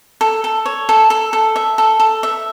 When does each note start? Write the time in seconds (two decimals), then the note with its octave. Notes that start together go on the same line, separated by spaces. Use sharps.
0.21 A4
0.44 A4
0.66 C#5
0.89 A4
1.10 A4
1.33 A4
1.56 E5
1.78 A4
2.00 A4
2.23 E5